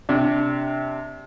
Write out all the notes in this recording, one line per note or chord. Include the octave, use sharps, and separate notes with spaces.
C3 D4